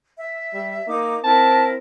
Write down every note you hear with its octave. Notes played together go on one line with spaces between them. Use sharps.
E5
G3
A#3 D#4 D6
C4 E4 A#4 A5